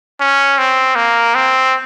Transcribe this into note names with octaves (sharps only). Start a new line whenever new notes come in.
C#4
C4
A#3
C4